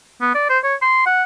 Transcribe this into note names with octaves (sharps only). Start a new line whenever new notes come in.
B3
D5
C5
C#5
C6
F#5